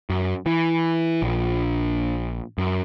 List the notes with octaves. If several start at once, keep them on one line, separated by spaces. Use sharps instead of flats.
F#2
E3
A#1
F#2